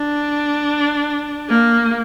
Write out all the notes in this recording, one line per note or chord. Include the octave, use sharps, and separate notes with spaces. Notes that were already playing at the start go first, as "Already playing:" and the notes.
Already playing: D4
A#3